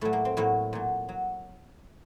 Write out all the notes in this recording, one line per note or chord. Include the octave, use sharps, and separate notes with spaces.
A2 F#3 A3
A#3
C4
A2 F#3 A#3
A#2 F#3
F#3